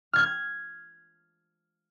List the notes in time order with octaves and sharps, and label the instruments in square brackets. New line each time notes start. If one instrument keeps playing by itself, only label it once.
[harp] F6 G#6